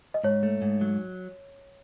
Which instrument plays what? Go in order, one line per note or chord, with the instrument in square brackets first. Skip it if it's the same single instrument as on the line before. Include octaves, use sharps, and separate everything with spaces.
[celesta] D#5
[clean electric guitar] G#2 [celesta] C#5
[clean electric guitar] A3
G#2
F#3